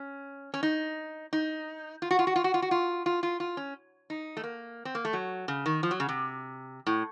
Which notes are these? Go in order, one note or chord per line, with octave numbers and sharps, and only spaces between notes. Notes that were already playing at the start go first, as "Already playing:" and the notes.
Already playing: C#4
C#4
D#4
D#4
F4
F#4
F4
F#4
F4
F#4
F4
F#4
F4
F4
F4
F4
C#4
D#4
A3
A#3
C4
A#3
A3
F#3
C#3
D#3
F3
F#3
C#3
C3
A2